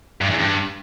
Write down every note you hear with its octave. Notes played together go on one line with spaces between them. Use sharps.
G2
E2
G2